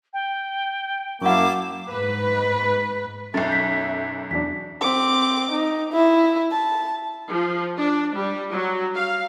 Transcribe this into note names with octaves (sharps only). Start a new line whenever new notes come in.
G5
F#2 A#3 E4 F5 F#5 A5 C#6 D6
G#2 B4
B1 F#2 A4 E5 A6
G6 B6
E2 F#3 D4 B6
C4 D6
D#4
E4
A5
F3
D4
G3
F#3
F5